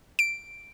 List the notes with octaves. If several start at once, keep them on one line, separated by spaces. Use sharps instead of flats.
D7